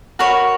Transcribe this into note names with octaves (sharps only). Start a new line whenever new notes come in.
F#4 A#4 C#5 B5